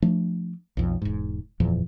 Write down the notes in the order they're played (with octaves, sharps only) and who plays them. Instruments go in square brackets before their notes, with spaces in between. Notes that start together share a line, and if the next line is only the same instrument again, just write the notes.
[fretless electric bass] F3 A3 D4
B1 F2
E1 G#2
F#1 E2 A#2 F3